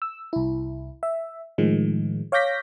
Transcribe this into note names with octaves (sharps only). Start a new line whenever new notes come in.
E6
C2 E4
E5
A2 D#3 F3 G#3
C#5 F5 D6 G6 A#6 B6